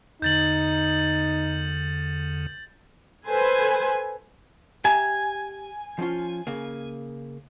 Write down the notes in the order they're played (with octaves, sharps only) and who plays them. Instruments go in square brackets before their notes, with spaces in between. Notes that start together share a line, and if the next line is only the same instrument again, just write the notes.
[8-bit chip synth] E2 D3 [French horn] D#4 [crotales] G6 A6 F#7
[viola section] A4 B4 C5 G#5
[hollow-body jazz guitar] G4 E5 A#5 [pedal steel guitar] G#5
[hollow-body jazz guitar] F3 C#4 F4
C#3 A#3